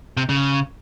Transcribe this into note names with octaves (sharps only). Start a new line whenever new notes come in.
C3
C#3